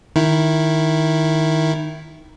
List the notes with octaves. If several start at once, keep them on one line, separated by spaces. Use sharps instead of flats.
D#3 E4